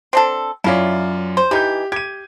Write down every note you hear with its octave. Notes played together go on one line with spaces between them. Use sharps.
C4 D4 A4
F#2 C#4 E4 F4 D5
C5
E3 D#4 G4 G6
G4 G#6 D#7